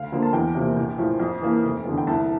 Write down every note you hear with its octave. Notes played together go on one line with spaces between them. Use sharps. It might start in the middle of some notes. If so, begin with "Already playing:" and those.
Already playing: D2 F5
D3 F3 A#3
A5
E2 G5
C3 F3 A#3
A#1
A2 F3
F2
E3 A#3
F1
E2 D3
G5
C2 A5